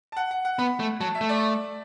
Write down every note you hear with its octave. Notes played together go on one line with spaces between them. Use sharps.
A5
F#5
F#5
F#5
B3 B5
A3
F#3 A5
E5
A3
D5